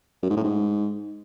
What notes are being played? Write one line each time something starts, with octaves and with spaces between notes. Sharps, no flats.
F#2
G#2
A2
G#2